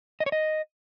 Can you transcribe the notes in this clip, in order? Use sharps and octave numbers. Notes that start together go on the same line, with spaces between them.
D#5
C#5
D#5